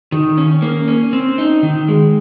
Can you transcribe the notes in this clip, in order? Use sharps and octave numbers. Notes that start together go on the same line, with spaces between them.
D#3
C#4
A#3
C#4
C4
D#4
D#3
G#3